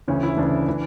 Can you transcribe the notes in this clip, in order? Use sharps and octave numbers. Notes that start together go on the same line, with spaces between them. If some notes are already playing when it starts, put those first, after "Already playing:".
D2 C#3 E3 C#4
E4
D2 C#3 E3 D4
E3